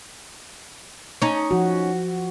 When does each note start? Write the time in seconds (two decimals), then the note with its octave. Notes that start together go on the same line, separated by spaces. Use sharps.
1.22 C#4 D#4
1.51 F3 F#4